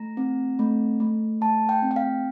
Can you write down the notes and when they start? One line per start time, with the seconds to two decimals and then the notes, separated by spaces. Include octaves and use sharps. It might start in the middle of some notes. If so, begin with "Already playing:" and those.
Already playing: A3 A#5
0.17 C4
0.59 A3
1.00 A3
1.41 A3 A5
1.69 G5
1.82 C4
1.91 G5
1.96 F5